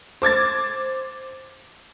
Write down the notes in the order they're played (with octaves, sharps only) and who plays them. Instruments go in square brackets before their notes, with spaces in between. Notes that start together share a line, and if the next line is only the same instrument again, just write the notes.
[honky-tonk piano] C5 D6 G#6 A6